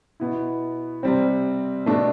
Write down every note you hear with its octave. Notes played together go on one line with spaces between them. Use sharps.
B2 B3 E4
C3 G3 C4
B2 A3 D4